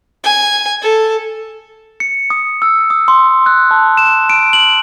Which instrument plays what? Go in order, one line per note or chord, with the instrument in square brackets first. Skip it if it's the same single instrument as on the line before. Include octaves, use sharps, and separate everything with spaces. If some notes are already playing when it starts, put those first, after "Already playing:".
[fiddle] G#5
A4
[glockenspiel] C#7
D#6
E6
D#6
C6
F#6
A5
E7
D7
F#7